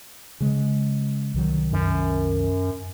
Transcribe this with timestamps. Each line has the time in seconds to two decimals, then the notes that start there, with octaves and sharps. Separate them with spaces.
0.40 C#3 G#3
1.34 C2 D#3 F#3
1.73 F#2